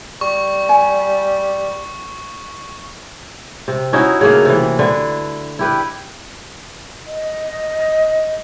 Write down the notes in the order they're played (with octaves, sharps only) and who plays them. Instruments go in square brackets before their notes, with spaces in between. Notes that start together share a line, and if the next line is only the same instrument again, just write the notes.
[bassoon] G3 [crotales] C#6
[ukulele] G#5
[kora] C3
C#4 D#4 E4 F#4
C#3 A3 A#3
C3 E3
D3 E4 B4
E4 G4 B4
[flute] D#5